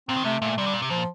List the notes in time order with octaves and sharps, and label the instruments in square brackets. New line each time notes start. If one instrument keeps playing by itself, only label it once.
[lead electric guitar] A#2 [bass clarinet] C4
[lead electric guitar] D#3
[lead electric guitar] C3 [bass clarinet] A3
[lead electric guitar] A#2 [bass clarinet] A3
[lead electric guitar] C3 [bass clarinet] G3
[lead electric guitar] D3
A#2
C3
[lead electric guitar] A#2 [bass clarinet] F3